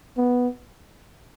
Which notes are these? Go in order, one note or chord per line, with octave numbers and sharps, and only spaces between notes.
B3